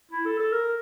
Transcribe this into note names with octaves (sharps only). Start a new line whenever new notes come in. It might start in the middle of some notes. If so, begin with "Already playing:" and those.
E4
A4
A4
A#4